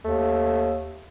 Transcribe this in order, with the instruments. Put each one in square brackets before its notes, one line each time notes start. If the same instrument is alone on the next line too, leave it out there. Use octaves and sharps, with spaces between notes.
[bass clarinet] D#2 [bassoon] A3